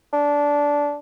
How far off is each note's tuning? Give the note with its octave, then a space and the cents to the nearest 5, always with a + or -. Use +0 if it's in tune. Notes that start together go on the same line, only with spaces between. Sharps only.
D4 -15